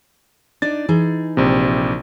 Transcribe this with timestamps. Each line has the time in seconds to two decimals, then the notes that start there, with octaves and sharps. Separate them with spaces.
0.62 D4 D#4 D5 A6
0.88 E3 D#4 G#4
1.37 A#1 C3